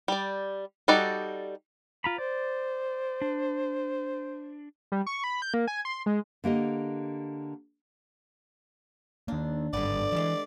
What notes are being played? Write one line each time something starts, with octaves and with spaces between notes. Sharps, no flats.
G3 D5
G3 D#4 F#4 A4 D5
F4 A#5 B5
C5 D5
D4
G3
C#6
B5
G6
A#3
G#5
C6
G#3
D3 A#3 G4 D#5
D#3 A#3 D4
G#1 G2 D3 B3 D5
E3 F3 G3 G#3